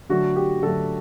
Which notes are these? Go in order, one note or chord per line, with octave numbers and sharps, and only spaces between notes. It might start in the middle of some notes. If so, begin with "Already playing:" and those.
D3 F#3 A3 F#4
G4
D3 F#3 A3 A4